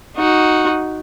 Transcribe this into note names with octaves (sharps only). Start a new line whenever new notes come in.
D#4 F#4